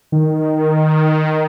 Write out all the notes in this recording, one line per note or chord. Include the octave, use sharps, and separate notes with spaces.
D#3